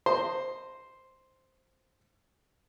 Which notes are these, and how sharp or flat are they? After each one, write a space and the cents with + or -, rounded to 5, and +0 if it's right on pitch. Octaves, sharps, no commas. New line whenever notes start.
C5 +0 D#5 -10